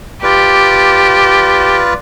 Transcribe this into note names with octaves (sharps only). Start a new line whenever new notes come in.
F4 G4 B4 D5